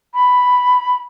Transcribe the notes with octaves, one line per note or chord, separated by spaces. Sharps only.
B5